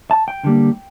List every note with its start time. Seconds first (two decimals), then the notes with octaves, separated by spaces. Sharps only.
0.11 A5
0.28 G5
0.44 D3 G3 A#3